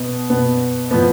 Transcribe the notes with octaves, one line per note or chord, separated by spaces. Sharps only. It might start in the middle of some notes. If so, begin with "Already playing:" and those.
Already playing: B2 B3
B2 B3
A2 F3 B3